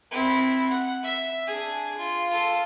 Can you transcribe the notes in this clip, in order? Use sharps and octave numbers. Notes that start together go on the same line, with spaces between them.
C4 E4
F#5
E5
D4 G#4
F4
F4 A4